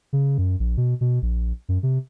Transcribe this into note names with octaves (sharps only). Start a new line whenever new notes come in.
C#3
F#2
A#1
B2
B2
A#1
F#2
C3